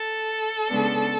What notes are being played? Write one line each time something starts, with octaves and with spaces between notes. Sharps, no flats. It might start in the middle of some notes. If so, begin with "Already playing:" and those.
Already playing: A4
C#3 G#3 B3 D4